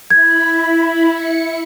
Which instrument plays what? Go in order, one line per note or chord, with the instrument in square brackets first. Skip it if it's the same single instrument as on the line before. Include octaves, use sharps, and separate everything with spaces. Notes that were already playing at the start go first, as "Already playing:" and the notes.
[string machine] E4 B5 [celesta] G#6
[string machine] E4 C#7